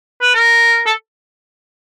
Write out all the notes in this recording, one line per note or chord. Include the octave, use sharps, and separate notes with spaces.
B4
A#4
A4